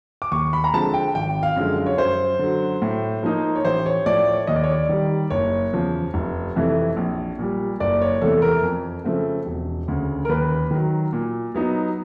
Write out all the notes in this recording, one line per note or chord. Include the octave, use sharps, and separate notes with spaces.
D6
D#2 C#6
B5
A#5
D3 F3 G#3 C4 A5
G5
G#1 G5
F5
F#2 D3 F3 G#3
C#5
F#2 C5
D3 F#3
A2
F3 A#3 D#4
C#5
A1 C5
C#5
A2 F3 D5
C#5
D#2 D#5
D5
C#5
D5
D#3 G3
F#1 C#5
E2 C#3 F3
F1
F2 C3 E3 A3
A#1
A#2 G3
F#1 D5
C#5
E2 C3 E3 A3 A4
A#4
F2
C#3 F3 A3 C4
E1
D2 C#3
A#4
D#2 B4
D#3 F#3
A#2
F#3 B3 D#4